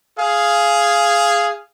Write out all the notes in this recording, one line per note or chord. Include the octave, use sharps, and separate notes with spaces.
G#4 F5